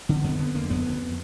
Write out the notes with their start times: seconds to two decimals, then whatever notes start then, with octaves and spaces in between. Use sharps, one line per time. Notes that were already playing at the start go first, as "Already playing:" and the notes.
0.09 D3 C4
0.24 F2 B3
0.39 D3 B3
0.55 D3 A#3
0.70 F2 B3
0.85 D2